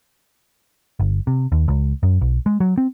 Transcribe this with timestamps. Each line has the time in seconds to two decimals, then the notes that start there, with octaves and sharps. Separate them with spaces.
1.00 G1
1.27 C3
1.52 D#2
1.68 C#2
2.03 F#2
2.21 B1
2.46 G#3
2.60 F#3
2.78 C4